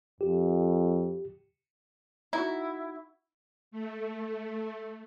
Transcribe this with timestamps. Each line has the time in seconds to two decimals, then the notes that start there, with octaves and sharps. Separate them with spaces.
0.21 F2 G4
2.33 D#4 E4 F#4
3.71 A3